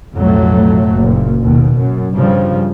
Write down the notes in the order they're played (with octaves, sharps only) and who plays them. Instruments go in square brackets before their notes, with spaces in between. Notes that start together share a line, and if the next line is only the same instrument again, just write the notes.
[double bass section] B1 F2 A2 F#3 A3
F#1 A#2
D#2 B2
F#2
G2 C#3 F3